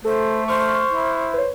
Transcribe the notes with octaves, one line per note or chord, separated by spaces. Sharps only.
A3 A4 C5
C5 C#6 F6
E4
B4 C#5